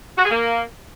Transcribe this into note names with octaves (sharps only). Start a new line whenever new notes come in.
F#4
G#4
A#3